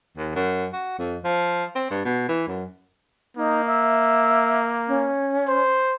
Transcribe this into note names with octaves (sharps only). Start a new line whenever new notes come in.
D#2
F#2
F#4
F2
F3
C4
G2
B2
E3
F#2
A#3 D#4
E5
C#4
C5